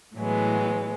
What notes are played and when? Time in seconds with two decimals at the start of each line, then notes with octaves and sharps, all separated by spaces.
0.16 A2 E3 F#3 G#3 B3